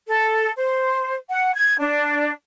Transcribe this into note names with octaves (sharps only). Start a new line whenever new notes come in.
A4
C5
F#5
G#6
D4